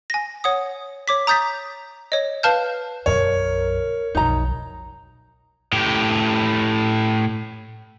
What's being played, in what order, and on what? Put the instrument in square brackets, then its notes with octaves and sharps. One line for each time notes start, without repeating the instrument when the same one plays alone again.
[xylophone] G#5 A#6
C#5 F#5 D#6
C#5 D6 B6
A#5 D#6 G6 A6 B6
C#5 D#5
B4 F5 A5 F6 G6
[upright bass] B1 F#2 [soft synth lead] A#4 [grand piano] C#5
[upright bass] B1 F2 [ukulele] D#4 A#5
[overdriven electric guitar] A2 G4